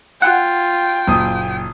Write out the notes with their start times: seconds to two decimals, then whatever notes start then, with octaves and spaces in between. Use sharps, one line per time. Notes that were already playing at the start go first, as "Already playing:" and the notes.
0.22 F4 F#5 G5
1.08 F#1 A#2 D#6